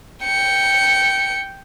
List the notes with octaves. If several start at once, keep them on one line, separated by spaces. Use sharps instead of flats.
G5 C#7